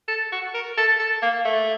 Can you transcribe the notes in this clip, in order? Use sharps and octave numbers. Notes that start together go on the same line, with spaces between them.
A4
F#4
A#4
A4
A4
A#3
A3